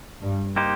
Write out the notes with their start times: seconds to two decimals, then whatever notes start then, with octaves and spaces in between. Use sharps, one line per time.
0.22 G2
0.56 A#3 D#4 G4 C5